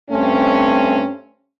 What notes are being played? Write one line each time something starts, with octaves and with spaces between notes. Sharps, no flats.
G2 A3 C4 C#4